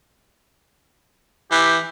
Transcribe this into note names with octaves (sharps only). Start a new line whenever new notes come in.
E3 G4